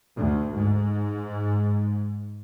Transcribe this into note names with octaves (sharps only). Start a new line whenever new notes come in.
D2
G#2